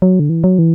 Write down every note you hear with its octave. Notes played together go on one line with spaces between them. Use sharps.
F#3
D3
E3
F#3
E3